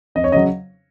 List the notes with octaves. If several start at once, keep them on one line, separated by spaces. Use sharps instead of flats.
F2 D#5
C#5
C#3 F#3 D#5